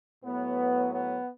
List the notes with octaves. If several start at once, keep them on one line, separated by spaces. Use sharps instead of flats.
A2 F#3 B3
B3